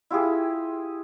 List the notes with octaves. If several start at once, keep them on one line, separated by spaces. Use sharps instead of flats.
E4 F4 G4 G#4